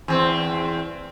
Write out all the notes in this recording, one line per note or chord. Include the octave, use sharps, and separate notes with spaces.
E2 C4